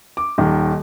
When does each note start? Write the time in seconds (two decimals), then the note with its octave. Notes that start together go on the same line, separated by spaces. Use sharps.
0.17 D6
0.38 D#1 D#3